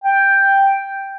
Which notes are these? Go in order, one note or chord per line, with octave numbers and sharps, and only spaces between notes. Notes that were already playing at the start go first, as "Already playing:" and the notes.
G5